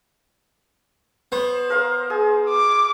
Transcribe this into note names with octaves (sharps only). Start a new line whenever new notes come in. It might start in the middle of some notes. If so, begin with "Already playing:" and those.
B3 C5
A#4 C5 F5
G#4
D6